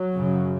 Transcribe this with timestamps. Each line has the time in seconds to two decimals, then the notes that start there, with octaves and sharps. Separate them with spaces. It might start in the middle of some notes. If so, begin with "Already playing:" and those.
Already playing: F#3
0.15 F#2 C#3